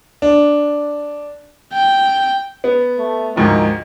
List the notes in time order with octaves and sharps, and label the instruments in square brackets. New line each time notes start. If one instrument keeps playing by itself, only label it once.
[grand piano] D4
[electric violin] G5
[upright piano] B3
[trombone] A3
[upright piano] D2 G#2 F3 [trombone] D#3